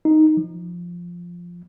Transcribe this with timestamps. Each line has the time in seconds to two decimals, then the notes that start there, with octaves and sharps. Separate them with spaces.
0.05 D#4
0.37 F3